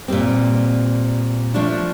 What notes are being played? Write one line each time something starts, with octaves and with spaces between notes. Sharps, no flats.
A#2 G3 C4
F3 A3 D4